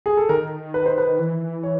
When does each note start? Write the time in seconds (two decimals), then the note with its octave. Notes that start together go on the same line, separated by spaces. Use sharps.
0.06 G#4
0.17 A4
0.29 D#3 A#4
0.74 B4
0.86 C5
0.98 B4
1.19 E3
1.63 C#5